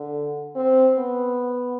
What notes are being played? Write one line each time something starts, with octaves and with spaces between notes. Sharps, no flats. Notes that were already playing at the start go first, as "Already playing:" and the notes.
Already playing: D3
C4
B3